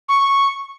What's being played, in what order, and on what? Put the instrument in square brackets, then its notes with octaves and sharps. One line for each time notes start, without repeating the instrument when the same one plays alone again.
[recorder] C#6